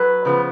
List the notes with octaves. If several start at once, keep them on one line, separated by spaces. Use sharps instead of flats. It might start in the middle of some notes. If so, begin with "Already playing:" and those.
Already playing: F#3 B4
C#3 F3 B3